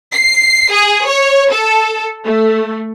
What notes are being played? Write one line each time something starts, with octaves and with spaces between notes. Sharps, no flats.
C7
G#4
C#5
A4
A3